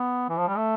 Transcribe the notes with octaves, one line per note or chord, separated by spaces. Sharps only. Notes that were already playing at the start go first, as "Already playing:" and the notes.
Already playing: B3
E3
F3
G3
A3